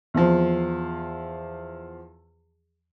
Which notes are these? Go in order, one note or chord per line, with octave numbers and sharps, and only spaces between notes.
E2 F3